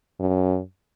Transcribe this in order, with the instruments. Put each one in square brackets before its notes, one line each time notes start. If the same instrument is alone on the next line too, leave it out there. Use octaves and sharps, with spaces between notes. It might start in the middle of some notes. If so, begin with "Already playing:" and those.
[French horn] F#2